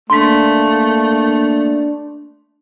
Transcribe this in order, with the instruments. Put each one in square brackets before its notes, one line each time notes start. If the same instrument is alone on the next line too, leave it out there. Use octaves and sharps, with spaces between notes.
[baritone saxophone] A3 [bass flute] A#3 [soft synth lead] D4 [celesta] C6 B6